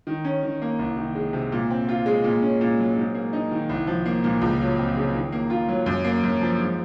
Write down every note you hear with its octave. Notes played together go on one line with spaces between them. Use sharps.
D#3
C#4
D#3
A#3
C2
D#3
G#3
C3
A#2
C4
F4
G#3
A#2
C#4
A#2
F#3
G#2
A#3
D#4
D#3
C2
F3
A#3
A#2
C#2
F#3
C4
C#3
D#3
A#3
F4
F#3
F#2
A#3
F#2
F3
G#2